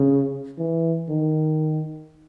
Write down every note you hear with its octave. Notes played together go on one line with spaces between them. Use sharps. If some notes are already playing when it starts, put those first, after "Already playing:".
Already playing: C#3
E3
D#3